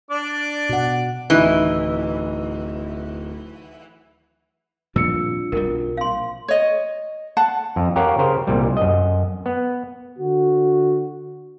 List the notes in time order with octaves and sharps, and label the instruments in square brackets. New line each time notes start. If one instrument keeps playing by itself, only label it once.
[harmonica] D4 D5 D6
[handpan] B2 F#5
[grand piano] D1 D#4 [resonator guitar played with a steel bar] E3
[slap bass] A#2 F3 G3 [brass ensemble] C4 D4 F4 [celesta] E6 C#7
[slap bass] B1 B2 G3 [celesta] A#4
[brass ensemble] A#1 [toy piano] F5 C6
[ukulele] C#5 D#5
F#5 A5
[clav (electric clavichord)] F2
G4 A#4 C#5 F5 F#5
C#3 A#4 C5
C2 A#2 G3
F#2 D#5
B3
[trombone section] D3 F#4